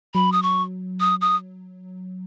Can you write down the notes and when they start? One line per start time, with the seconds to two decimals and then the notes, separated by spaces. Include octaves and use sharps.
0.15 F#3 B5
0.32 D#6
0.43 C#6
1.00 D#6
1.21 D#6